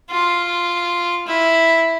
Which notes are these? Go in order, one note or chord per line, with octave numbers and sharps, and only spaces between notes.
F4
E4